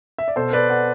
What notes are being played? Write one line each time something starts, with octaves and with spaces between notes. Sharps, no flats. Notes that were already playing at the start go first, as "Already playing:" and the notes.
E5
D5
B2 A4 C5
B4 D5
D5 F#5